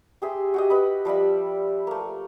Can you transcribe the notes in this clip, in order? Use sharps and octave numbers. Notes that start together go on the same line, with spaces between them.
G4 G#4 E5 C6
F#4 G4 D#5
B4 D#5 B5
F3 G3 E5 B5
A3 A#3